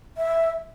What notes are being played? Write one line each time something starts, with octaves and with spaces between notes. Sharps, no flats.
E5